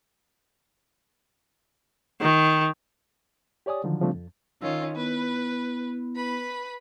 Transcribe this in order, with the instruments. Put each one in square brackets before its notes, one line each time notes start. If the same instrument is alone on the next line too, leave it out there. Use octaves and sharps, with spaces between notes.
[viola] D#3
[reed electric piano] G4 C#5 D5 G#5 D#6
D3 D#3 F3 F#3
C#3 F3 G3 A3 C4 D4
F2
[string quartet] D#3 C#4 F4 [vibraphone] E6
[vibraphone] B3 E4 [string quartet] B4
[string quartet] B4 B5